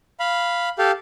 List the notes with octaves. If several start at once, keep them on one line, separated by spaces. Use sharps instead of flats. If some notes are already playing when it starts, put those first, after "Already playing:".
F5 B5
G4 A4 F5